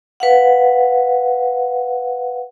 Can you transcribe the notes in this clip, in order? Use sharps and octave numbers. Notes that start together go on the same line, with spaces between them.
B4 F5 F#5